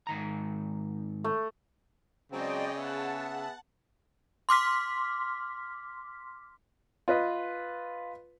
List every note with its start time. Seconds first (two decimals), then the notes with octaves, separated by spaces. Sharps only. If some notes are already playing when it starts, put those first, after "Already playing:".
0.07 G#2 D#3 A#5
1.24 A3
2.32 C#3 F#3 G#3 C4 D5 D#5 G5
2.78 B3 G#4 E5 F#5 A5
4.49 C6 D6 F6 B6
7.08 F4 B4 D#5